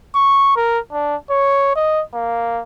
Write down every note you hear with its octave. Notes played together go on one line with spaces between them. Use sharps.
C#6
A#4
D4
C#5
D#5
A#3